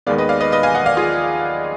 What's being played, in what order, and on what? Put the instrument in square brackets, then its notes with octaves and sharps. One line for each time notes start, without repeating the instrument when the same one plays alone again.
[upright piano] D#2 D#3 G#3 B3 D5 F5
B4 D#5
D5 F5
B4 D#5
B4 D#5
F5 G#5
D#5 F#5
D5 F5
F4 G#4